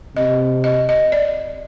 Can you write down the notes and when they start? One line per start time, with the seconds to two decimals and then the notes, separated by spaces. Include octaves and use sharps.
0.16 C3 D#5
0.64 D#5
0.89 D#5
1.12 D5